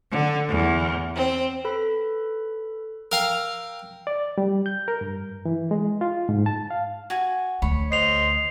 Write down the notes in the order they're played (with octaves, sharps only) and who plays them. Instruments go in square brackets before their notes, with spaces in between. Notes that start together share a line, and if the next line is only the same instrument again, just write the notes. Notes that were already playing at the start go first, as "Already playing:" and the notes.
[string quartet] D3
E2
C4
[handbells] A4 B4 B5
[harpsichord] A#4 F5 A#5 [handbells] G5 E6
[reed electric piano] D5
G3
G6
A#4
G2
E3
G#3
F4
G#2
A5
F5
[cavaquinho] F#4 G#5
[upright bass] D2 [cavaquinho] C#5 B5
[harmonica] C5 D#5 [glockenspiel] C7 F7